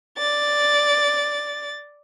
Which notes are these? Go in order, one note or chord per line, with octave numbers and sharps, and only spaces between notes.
D5 A6